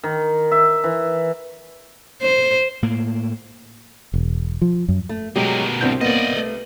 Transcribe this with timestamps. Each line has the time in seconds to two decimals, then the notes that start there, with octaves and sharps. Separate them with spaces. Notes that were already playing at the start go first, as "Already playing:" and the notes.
0.03 D#3
0.51 E5
0.84 E3
2.22 C5
2.82 A2 A#3
4.14 E1
4.62 F3
4.88 F#2
5.09 A3
5.36 B2 F#3 G#3 G4 A#4
5.81 C2 C4 D4 F#4 G6
6.01 A#3 B3 D5 D#5
6.37 A3